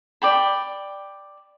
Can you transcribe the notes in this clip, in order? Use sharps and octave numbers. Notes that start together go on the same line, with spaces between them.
D5 G5 B5